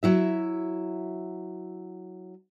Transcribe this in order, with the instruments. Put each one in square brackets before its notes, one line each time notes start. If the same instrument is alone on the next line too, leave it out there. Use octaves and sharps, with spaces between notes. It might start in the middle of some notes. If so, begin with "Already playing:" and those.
[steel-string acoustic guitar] F#3 E4 E5